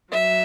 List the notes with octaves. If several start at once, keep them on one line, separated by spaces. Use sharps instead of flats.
F#3 E5